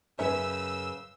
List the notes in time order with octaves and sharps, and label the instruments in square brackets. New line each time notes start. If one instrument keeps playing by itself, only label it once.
[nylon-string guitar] F#2 B4 [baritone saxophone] C#3 [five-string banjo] C#4 E5 [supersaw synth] E6